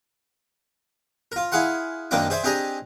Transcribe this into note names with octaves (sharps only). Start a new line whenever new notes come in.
F4 A#4
E4 G#4 F5 F#5 C6
F#2 D#3 A#3 C4 D4 D6
G#4 C5 D5 E5 C6
C4 D4 G4 G#4 D#5 A#5